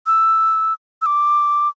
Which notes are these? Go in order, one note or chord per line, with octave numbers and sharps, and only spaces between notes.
E6
E6
D6